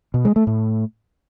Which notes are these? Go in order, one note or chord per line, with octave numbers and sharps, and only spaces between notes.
B2
G#3
A3
A2